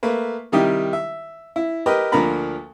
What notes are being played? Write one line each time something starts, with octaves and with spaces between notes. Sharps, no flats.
A3 A#3 B4
C3 D#3 G3 D#4 E4 G4
E5
E4
G4 A#4 B4 D#5
D2 F3 A#3 D4 A#5 B5